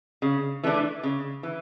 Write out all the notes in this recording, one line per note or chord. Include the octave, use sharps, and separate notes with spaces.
C#3
E3 A3 D4
C#3
E3